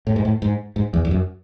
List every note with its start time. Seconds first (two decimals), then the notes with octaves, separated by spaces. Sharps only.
0.07 A2
0.16 G#2
0.25 A2
0.42 G#2
0.76 G#2
0.94 E2
1.05 E2
1.11 F#2